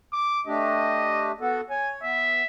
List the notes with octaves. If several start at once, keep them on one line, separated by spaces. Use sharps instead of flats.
D6
A3 D4 G4 D#5
B3 F#4 A4
C#5 G#5
B3 E5